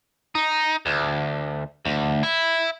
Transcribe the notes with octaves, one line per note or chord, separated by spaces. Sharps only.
D#4
D2
D2
E4